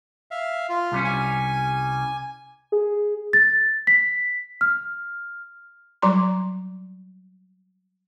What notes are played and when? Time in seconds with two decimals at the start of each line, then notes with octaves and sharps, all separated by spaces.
0.31 E5 F5
0.69 F4
0.92 C2 G3 C#4
1.04 G#5
2.72 G#4
3.33 A6
3.87 B6
4.61 F6
6.02 F#3 G3 A#5 C6